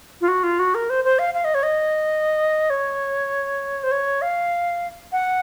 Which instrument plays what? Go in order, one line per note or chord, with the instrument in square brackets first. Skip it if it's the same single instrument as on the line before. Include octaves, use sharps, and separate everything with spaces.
[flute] F4
F#4
F4
F#4
A#4
C5
C5
F5
F5
D#5
C#5
D#5
C#5
C5
C#5
F5
F#5